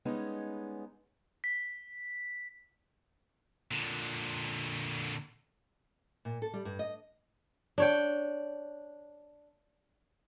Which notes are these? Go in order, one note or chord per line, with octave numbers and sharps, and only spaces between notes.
G3 G#3 B3 C#4 D#4 G#4
B6
A#2 D3
A#2
A4
G3
G2
D#5
D4 C#5 G5